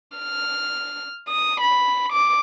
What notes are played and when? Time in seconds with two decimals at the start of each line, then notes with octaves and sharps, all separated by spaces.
0.17 F6
1.28 D#6
1.61 B5
2.12 D6